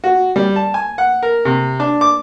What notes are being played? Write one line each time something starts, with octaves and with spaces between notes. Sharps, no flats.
F#4
G3
A5
G#5
F#5
A#4
C3
D4
D6